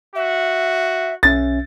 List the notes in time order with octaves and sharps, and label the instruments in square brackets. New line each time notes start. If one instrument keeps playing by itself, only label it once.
[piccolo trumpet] F#4 [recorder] E5
[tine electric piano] B1 C#4 E5 [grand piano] A6